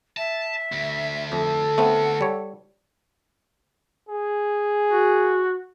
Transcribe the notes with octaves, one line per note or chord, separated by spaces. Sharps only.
E5 A5
D2
F2 A4
A3 B3 C4 F#5
G3 C#5
G#4
F#4